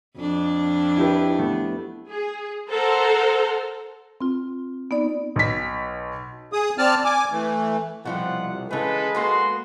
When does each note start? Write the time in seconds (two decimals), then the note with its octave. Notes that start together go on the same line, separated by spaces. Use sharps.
0.18 F2 D4
0.97 E4 G4 B4
1.39 A3 B3
2.08 G#4
2.68 A4 A#4 C5 F#5 A#5
4.21 C4 F4
4.91 B3 D#4 D5
5.36 B1 B6
6.53 G#4 D#6
6.78 C4 D5 A5 F6
7.04 G#5 D6
7.32 E3 A3
8.05 C2 B2 F3 G3 F4 F#5
8.71 C#3 E3 G#3 A4 B4
9.15 A#3 B3 F#4 A4 C6